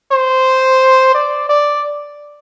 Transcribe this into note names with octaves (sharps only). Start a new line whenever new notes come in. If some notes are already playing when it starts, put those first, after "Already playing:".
C5
D5
D5